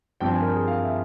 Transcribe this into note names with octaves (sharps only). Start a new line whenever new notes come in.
G2 F3 C4 G5
G#5
A#4
G#4
F5
E5